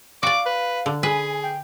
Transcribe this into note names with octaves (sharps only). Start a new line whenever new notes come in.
F#4 D5 F5 D6
B4
D3
G#4 B4 G#5
G5